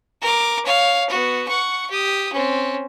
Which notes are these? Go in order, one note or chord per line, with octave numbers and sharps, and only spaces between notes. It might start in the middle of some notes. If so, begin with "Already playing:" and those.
A#4 D6
C#5 F5
B3 F#4
F#5 C#6
G4 D#6
C4 C#4